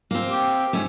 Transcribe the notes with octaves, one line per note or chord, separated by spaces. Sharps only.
A#3 C4
G4
G#2 A3 C#4